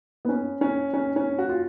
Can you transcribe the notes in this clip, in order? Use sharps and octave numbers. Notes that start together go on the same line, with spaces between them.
B3
C#4
C#4
C#4
C#4
F#4
F4